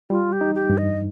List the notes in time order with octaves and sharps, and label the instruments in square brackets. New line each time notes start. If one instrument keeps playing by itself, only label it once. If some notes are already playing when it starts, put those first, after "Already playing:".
[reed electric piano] G3 [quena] F4
[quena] G4
[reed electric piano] D#4
[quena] G4
[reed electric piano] G2
[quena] D#5